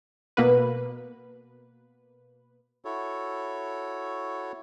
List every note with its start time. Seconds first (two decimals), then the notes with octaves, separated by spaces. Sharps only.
0.37 B2 A#3 B3 B4
2.85 E4 F#4 A4 C#5